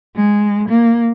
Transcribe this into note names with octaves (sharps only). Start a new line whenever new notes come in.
G#3
A#3